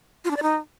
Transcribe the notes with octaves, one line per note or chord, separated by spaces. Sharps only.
F4
D4
D5
D#4